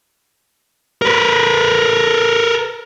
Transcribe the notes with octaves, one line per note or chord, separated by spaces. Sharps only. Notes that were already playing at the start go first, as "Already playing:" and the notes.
A#4 B4